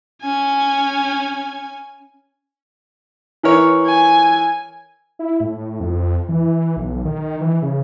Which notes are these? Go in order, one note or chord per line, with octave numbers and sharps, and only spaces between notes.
C#4 G#5
E3 A#4 C#5
G#5
E4
A2
F2
E3
B1
D#3
E3
C#3